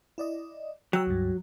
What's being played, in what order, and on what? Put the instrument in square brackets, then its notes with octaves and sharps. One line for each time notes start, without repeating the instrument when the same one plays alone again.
[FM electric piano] E4 D5 D#5
[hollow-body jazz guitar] F#3 [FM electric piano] G5 A#5 E6
[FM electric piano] C#2 G2